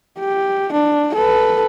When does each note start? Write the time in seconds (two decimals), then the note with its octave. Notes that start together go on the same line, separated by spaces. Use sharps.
0.20 G4
0.73 D4
1.15 A4 B4